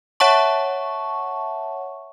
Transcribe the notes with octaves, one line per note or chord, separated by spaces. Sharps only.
C#5 E5 F#5 A5 C#6